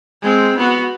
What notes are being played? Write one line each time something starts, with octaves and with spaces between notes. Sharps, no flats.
G#3 C4
B3 F#4